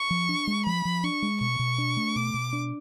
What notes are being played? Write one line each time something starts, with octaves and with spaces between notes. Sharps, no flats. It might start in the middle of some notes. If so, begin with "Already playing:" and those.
Already playing: C#6
F3
D4
G#3
F3 B5
F3
D4 C#6
G#3
B2 C#6
B2
D4
A3
B2 D6
B2
D4